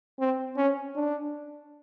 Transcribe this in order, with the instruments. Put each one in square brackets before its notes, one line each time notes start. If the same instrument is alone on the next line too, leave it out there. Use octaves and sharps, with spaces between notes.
[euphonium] C4
C#4
D4